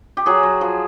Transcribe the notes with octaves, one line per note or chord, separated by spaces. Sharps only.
G4
F#3 F#4 G#4
F#3
F3